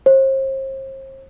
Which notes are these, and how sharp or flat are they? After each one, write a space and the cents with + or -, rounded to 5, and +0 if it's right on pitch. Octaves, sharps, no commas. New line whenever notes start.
C5 +40